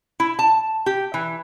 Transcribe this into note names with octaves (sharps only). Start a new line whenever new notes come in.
E4
A5
G4
E3